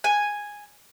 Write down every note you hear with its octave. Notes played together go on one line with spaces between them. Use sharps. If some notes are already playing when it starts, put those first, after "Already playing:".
G#5